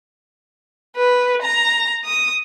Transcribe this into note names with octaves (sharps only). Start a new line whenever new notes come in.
B4
A#5
D#6